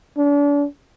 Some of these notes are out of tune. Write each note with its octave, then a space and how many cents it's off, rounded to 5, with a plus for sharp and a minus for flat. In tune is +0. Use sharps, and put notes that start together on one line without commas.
D4 -40